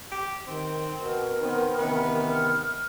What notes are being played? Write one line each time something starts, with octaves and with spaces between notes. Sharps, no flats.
G4
D#3 C4
B2 A#4
D#3 B3 C4
A1 C3 D#3 B3
F6